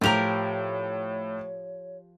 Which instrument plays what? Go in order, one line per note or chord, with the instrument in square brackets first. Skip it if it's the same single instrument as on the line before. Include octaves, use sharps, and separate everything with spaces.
[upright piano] A2 F7 [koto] F3 G4 A#4 [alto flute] C#5